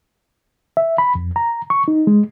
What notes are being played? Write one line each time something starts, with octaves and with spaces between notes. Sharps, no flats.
E5
B5
F2
A#5
C#6
D#4
G#3